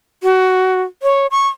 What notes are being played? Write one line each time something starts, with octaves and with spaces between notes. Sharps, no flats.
F#4
C#5
C#6